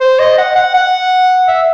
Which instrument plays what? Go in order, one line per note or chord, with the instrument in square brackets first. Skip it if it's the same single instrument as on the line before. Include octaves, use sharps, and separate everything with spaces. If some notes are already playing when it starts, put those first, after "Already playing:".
[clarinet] C5
D#5
F#5
F#5
F#5
E5